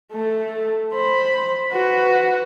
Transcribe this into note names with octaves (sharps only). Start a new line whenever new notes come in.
A3 A4
C5 B5
F#4 B4